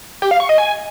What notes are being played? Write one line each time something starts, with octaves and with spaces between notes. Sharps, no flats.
G4
F5
C#6
D#5
G#5